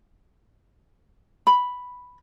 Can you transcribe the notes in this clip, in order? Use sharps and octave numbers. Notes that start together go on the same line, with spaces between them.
B5